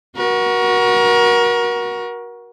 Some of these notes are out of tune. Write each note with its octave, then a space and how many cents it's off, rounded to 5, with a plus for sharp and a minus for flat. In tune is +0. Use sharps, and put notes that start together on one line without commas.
F#4 +0 A#4 +35